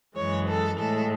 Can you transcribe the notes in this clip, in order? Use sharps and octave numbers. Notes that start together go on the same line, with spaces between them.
F#2 E3 G#3 C#5
A4
A2 G#3 A4